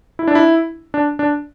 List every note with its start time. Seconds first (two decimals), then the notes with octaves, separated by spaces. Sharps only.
0.19 E4
0.28 D4
0.35 E4
0.94 D4
1.19 D4